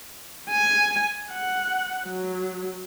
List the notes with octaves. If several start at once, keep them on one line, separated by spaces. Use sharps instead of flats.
G#5
F#5
F#3